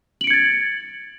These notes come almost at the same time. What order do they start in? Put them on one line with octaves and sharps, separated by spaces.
F#7 D7 C#7 G#6 A6